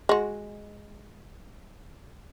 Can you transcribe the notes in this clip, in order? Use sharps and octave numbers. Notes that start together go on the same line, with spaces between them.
G#3 F#4